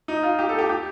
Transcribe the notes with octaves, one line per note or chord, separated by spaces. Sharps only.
D#4
F4
G4
A4
G4
G4